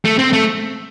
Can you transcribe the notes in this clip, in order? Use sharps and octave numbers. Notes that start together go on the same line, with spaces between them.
A3
C4
A3